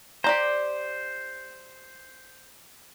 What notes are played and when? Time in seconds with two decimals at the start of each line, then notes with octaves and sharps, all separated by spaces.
0.24 G4 C5 D5 A#5